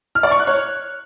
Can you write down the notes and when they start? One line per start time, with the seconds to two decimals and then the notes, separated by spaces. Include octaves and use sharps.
0.15 F6
0.23 D5
0.31 C#6
0.39 F#6
0.47 C#5